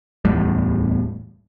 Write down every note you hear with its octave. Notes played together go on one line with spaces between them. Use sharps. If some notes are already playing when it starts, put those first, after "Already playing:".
D1 E2 A2 G3